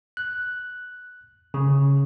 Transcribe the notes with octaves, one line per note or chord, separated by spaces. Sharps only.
F#6
C#3